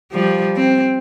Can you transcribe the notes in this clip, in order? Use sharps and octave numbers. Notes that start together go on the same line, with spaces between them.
F3 G3
C4